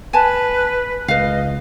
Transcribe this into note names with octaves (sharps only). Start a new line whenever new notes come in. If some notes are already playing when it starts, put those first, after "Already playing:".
B4 G#5 A5
C#2 B4 D#5 F5